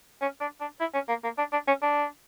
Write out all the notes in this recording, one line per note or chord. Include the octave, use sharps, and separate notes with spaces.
C#4
D4
D4
E4
C#4
A#3
A#3
D4
D4
C#4
D4